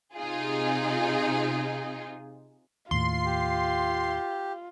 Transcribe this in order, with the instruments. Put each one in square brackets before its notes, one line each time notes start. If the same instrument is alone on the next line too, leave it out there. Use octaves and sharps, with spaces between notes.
[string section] C3 D#4 F4 G#4
[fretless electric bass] D#2 A2 [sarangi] F4 [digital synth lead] C6
[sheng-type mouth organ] G4